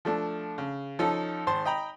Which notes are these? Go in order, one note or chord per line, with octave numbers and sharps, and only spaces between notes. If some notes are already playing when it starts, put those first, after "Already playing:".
F3 A3 D4
C#3
F3 C#4 D#4 A4
G#1 C5 A5 C6
D#5 G5 A#5 B5